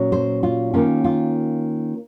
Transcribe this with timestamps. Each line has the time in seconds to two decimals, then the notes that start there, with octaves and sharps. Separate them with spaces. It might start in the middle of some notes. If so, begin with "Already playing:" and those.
Already playing: A#2 F#3 C#4
0.12 C5
0.43 F4
0.74 D#3 A#3 C#4 F4
1.04 F4